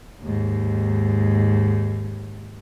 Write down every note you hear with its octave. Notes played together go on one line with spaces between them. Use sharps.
D#2 G#2